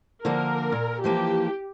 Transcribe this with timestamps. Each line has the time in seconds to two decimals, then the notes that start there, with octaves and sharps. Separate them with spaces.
0.25 D3 F3 A#3 A#4
0.72 A#2
1.04 E3 F3 A#3 G4